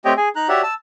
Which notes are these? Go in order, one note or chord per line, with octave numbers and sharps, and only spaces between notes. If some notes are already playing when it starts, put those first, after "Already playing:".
A3 C4 G4 C#5 D#5 G5
G#4 G#5
D#4 A#5 F#6
F#4 G4 C#5 D5 E5 F#5
A5 E6